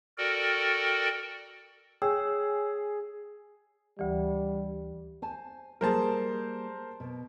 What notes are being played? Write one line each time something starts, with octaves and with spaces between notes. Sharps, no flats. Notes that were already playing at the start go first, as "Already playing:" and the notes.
F#4 A4 A#4 D5 G5
G#4 C#5 G5 E6
D2 E3 G3
C5 G#5 A5
G3 A#3 G#4 A#4 C5 A5
B2